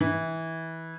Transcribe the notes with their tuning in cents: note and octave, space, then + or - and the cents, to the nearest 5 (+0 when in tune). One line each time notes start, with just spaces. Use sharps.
E3 -20